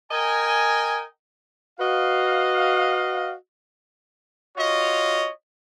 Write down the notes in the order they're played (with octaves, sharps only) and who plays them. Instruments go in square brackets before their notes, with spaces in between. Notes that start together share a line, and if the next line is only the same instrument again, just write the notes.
[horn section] A#4 D#5 G5 G#5
F#4 B4 D#5 F5
[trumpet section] F4 F#4 C#5 D#5